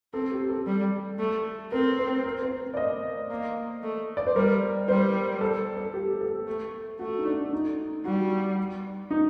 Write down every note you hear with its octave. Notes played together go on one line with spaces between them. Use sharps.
C4 A4
G4
A4
G3
A3
C4 A#4
C5
A#4
C5
D5
D#5
A#3
A3
D5
C5
G3 A#4
G3 C5
A4
A4
G4
A4
A3
A3 F#4
D#4
D4
D#4
G3 F#4
D#4